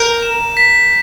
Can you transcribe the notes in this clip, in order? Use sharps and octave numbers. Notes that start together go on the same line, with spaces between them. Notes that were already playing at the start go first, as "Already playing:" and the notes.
Already playing: A#4 G6
E7
B6